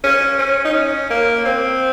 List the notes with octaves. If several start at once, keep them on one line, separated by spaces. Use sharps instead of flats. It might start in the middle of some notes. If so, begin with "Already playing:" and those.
C#4
C#4
D#4
C#4
A#3
C4